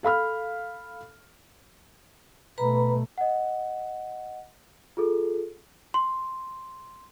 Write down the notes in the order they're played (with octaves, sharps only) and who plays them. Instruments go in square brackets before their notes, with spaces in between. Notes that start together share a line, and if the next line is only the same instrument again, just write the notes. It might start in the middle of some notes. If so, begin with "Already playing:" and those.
[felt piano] A4 F5 B5 F6
[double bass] B2 A3 [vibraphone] B4 A#5 B5
[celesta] D#5 F#5
F4 G#4 A4
C6